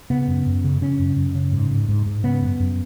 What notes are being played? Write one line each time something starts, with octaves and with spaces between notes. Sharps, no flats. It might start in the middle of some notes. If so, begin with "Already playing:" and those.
C#3 B3
F#2
F#2
C#3
C#3 C#4
F#2
F#2
C#3
G#2
G#2
G#2
G#2
C#3 B3
F#2
F#2